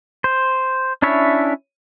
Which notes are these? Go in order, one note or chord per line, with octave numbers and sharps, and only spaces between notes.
C5
C#4 D4 E4 C#5 E5